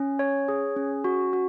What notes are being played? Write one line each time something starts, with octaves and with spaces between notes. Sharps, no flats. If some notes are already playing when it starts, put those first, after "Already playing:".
Already playing: C#4
C#5
G#4
C#4
F#4
F#4